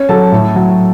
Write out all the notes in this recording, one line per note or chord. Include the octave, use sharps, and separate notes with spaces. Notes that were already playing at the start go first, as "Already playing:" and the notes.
Already playing: C#4 C#5
F#3 A4 A5
A2
F#3